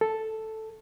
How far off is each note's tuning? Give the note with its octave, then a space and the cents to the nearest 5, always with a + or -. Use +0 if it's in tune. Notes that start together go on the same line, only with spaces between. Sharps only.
A4 +0